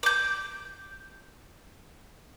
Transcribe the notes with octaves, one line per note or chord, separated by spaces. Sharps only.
D6 G6